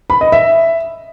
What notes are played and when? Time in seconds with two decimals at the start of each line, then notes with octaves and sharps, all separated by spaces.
0.10 B5
0.21 D#5
0.32 E5